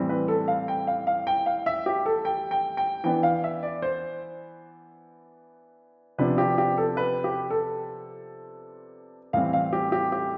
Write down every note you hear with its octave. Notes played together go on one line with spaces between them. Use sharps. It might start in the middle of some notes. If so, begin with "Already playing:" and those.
Already playing: A2 E3 G3 C4
B4
A4
F5
G5
F5
F5
G5
F5
E5
G4
A4
G5
G5
G5
E3 B3 D4 G5
F5
E5
D5
C5
C3 F3 B3 D4 B4
G4
G4
A4
B4
G4
A4
A2 E3 G3 C4 F5
F5
G4
G4
G4